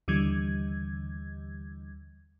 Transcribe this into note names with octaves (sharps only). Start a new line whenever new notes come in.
D#2 D3 E3 G3 G#6